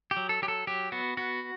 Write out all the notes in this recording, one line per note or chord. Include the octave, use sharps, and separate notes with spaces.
G4
F#3
A4
F#3 G4
A4
F#3 G4
B3 F#4
B3 F#4